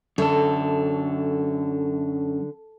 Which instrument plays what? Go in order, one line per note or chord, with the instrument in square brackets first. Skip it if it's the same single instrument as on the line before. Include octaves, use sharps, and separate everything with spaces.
[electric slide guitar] F#2 A4 [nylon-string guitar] D3